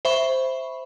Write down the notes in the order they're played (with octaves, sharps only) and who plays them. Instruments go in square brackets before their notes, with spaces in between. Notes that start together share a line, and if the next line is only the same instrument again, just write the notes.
[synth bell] C5 E5 B5 C#6